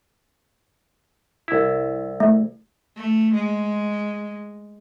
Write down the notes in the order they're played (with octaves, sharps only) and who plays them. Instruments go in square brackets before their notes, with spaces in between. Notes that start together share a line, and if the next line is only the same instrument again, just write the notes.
[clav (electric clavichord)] C2 E4
[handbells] A3
[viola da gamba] A3
G#3